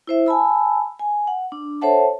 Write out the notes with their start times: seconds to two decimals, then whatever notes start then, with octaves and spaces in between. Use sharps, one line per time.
0.07 E4 C5 E5
0.26 G#5 A5 B5 E6
0.99 G#5
1.27 F#5
1.52 D4
1.82 A4 C5 C#5 E5 F#5 A5